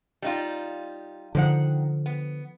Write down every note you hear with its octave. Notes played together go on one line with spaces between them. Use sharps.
G3 D#4 F4
D3 D#3 F3 F#5
B3